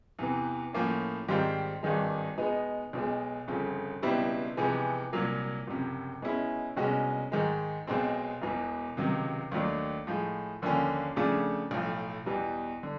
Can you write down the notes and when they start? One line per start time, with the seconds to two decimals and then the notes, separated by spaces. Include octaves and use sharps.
0.19 E2 C3 E3
0.73 A2 F3 A#3 C#4
1.28 G#2 D#3 G3 C4 F4
1.83 G#1 G2 D#3 G#3
2.38 B2 G#3 B3 D#4
2.93 B1 B2 G#3
3.48 G1 F2 C#3
4.02 C#2 B2 G3 C4 E4
4.57 F2 C3 E3 G#3 B3
5.13 C2 A#2 F#3 A#3
5.67 F#1 F2 C3
6.22 B2 G#3 C#4 E4
6.77 C2 B2 G#3 C#4 F#4
7.32 G#2 D#3 G#3
7.87 B1 B2 G#3 C4
8.42 E1 E2 B2
8.97 C#2 C3 D#3 F#3
9.51 D#2 D#3 F#3 A3 D4
10.07 A2 F3 G#3
10.62 D#2 D3 F3 A#3 C#4
11.16 F2 C#3 F3 A3 D4
11.71 B1 A2 F3
12.26 E2 B2 G3
12.83 D3